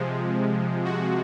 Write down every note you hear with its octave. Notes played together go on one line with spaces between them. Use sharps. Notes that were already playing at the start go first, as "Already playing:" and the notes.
Already playing: C3 F3 G#3
F#4